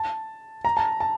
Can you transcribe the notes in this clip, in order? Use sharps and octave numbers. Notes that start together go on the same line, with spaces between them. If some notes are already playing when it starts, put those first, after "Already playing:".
Already playing: A5
A#5
A5
A5